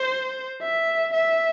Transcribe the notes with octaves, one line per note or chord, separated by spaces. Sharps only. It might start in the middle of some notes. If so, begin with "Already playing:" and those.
Already playing: C5
E5
E5